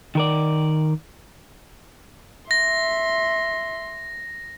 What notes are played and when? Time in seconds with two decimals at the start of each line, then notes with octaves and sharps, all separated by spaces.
0.15 D#3 A#4 D5
2.51 E5 C6 A#6